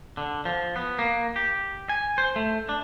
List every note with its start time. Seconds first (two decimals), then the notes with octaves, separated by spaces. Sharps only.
0.17 D3
0.45 F3
0.76 B3
0.99 A#3
1.36 G4
1.89 G#5
2.18 C5
2.36 A3
2.69 D4